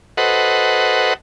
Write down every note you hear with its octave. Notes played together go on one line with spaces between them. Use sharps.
F#4 A4 B4 C5 D#5 F#5